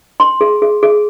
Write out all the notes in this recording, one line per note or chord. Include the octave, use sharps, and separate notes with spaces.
C6
G#4
G#4
G#4